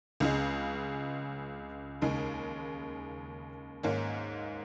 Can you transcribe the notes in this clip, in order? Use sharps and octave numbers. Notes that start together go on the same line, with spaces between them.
C#2 C#3 G#3
D#2 C#3 G#3 D#4
G#2 D#3 A#3 C#4